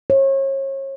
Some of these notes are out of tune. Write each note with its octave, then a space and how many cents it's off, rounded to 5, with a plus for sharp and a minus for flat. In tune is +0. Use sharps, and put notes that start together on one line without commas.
C#5 -35